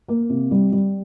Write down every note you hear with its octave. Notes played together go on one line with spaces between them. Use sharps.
A#3
C3
G3
G3